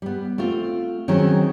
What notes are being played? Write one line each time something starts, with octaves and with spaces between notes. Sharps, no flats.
G3 B3
A3 C4 F4
D#3 F#3 C4 C#4 G#4